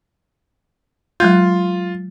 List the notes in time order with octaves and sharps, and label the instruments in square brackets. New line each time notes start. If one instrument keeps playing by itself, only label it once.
[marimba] F#3 G#3 G6 [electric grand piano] F4